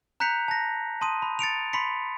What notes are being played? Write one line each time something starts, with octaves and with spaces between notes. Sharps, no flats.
A#5 F#6 G6 B6 C#7 F7
A5 A#6
A5 C6 D#6 D#7
B5
A6 C#7 D7 F7
B5 C6 B6 C#7